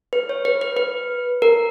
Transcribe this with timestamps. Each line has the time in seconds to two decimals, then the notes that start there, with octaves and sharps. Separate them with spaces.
0.13 B4
0.29 C#5
0.45 B4
0.61 B4
0.77 B4
1.42 A#4